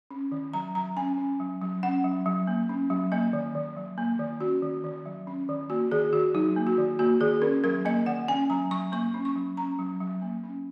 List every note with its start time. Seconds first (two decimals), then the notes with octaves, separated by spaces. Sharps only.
0.11 C#4
0.32 D#3
0.54 F#3 A#5
0.75 F#3 A#5
0.96 C#4 G#5
1.18 C#4
1.40 F#3
1.62 F#3
1.83 C#4 F#5
2.04 F#3
2.26 F#3
2.47 A#3
2.69 C#4
2.90 F#3
3.12 A#3 D#5
3.33 D#3
3.55 D#3
3.77 F#3
3.98 A#3
4.19 D#3
4.41 C#4 F#4
4.62 D#3
4.84 D#3
5.06 F#3
5.27 C#4
5.49 D#3
5.70 A#3 F#4
5.92 D#3 G#4
6.13 D#3 F#4
6.35 F#3 D#4
6.56 A#3
6.67 F#4
6.78 D#3
6.99 A#3 F#4
7.21 D#3 G#4
7.42 C#4 A#4
7.64 F#3 A#4
7.85 A#3 D#5
8.06 D#3 F#5
8.28 C#4 G#5
8.50 F#3 A#5
8.71 F#3 C#6
8.92 A#3 C#6
9.14 C#4
9.25 C#6
9.36 F#3
9.57 C#4 A#5
9.79 F#3
10.00 F#3
10.22 A#3
10.44 C#4